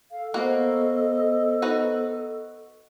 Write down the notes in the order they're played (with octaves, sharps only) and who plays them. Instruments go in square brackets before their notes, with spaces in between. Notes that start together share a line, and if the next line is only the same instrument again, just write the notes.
[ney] A4 [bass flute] F5
[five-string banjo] A#3 F#4 [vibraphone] B3 C5 [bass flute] D#5
[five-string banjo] D#4 F#4 B4